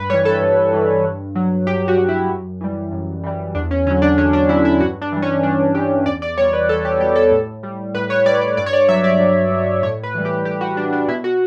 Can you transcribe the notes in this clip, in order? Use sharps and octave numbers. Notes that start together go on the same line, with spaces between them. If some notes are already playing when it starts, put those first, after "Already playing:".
Already playing: G2 B4
E3 G3 C#5
A4
G2
E3 G3
G2
F#3
G2 G4
F#4
F#3
E4
F#2
E3 G3
F#2
E3 G3
E2 D4
C#4
D3 F#3 C#4
D4
E2 C#4
D4
D3 F#3 E4
E4
G2 F#4
D4
E3 G3
C#4
G2 D4
E3 G3 G4
E2 D5
D5
B2 G3 C#5
B4
E2 A4
G4
B2 G3 G4
A4
A2
G3
A2 B4
C#5
G3 D5
D5
G2 D5
C#5
D5
F#3 E5
D5
G2
F#3
A2 C#5
B4
E3 G3
G4
A2 G4
F#4
E3 G3 D4
D4
B2 E4
F#4